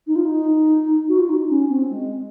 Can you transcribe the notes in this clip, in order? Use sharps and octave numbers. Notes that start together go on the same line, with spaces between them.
D#4
F4
D#4
F#4
F4
D#4
C#4
C4
G#3